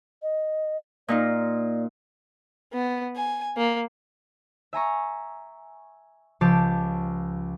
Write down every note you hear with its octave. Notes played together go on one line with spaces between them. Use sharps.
D#5
A#2 D#4 F4 D5
B3
G#5
A#3
E5 G#5 A#5 C#6
C#2 F3 G4 A5 D6 E7